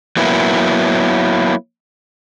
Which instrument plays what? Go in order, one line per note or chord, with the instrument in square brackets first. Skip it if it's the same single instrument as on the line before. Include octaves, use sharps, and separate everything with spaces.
[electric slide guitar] F#3 A#3 B3 E4